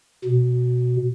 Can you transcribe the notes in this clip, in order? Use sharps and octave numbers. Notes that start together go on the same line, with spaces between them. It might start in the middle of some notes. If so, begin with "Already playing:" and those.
B2